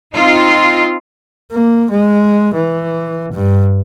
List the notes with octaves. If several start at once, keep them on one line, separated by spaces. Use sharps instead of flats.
C4 D#4 F4
A#3
G#3
E3
G2